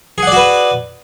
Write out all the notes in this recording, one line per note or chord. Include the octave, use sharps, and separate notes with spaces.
F#4 G#4 B4 D5 F#5